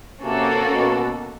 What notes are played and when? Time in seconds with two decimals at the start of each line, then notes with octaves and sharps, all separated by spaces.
0.21 C3 A#3 C#4 F#4 A4
0.73 B2